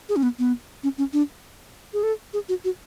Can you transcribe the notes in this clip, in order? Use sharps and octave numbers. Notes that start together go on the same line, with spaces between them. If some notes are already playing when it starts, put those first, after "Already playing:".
G#4
C#4
B3
B3
C#4
C#4
D4
G#4
A4
G#4
F#4
F#4